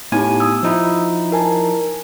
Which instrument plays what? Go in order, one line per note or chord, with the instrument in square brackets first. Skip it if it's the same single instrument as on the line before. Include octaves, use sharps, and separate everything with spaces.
[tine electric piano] A2 G#5 [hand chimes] B3 D#4 G4
[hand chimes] D#6 E6
[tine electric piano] F3 D#4 E4
[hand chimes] A#4 G#5 A5